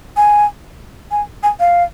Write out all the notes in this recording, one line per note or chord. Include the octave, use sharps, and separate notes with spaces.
G#5
G#5
G#5
F5